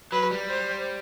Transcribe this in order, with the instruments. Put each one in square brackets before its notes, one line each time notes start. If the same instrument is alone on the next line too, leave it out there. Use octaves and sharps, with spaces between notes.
[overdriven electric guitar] F#3 [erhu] B4
[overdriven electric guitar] G3
[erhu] C5